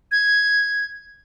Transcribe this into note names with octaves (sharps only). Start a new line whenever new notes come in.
G#6